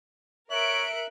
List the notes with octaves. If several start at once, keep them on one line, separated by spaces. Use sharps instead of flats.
A#4 C#5 E5 F#6 C#7 D7